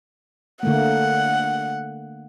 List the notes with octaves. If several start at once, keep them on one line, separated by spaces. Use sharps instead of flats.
D3 A3 A#3 F#5